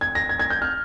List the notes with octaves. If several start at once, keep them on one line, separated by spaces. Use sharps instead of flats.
G#6
A#6
G#6
G#6
G6
F6